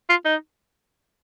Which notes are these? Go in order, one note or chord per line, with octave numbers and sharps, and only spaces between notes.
F4
D#4